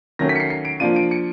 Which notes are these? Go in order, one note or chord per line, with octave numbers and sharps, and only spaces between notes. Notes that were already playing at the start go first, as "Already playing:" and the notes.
D#3 F#3 A3 C#4 A#6
B6
C#7
C7
C7
D7
F3 A#3 D4 F4 D#7
D7
C#7